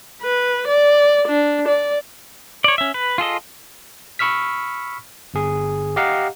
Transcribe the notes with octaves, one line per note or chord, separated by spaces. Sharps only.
B4
D5
D4
D5
C#5 D5
C#4 E5
B4
F4 G#4 A4 D#5
B5 C#6 E6 F6 B6
G1 G#4
G4 D#5 F5 F#5 A#5